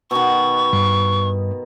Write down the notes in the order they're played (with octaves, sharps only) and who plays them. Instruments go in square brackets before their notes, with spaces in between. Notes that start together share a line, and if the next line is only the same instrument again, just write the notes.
[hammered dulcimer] B2 D#3 [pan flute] C#6
[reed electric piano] G2